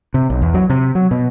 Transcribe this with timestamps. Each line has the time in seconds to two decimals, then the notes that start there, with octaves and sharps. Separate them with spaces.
0.14 C3
0.30 B1
0.42 E2
0.54 F#3
0.69 C3
0.95 F#3
1.11 B2